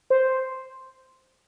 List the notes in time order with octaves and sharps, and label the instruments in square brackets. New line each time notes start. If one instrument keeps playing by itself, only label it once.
[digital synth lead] C5